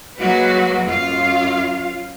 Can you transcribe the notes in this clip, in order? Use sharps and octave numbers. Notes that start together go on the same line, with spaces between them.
F#3 G#3 A#3 F#4 B4
F#2 F4 F5